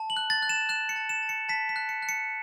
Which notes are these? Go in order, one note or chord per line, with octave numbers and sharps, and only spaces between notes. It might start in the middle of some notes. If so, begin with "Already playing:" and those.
Already playing: A5
F#7
F#6
A6
F#6
E7
F#6 E7
C#7
A5
E7
A5
C#7
A5 B6
B6
F#6
C#7
F#6
C#7